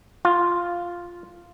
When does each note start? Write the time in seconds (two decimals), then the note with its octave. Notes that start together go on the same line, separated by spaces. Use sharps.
0.25 F4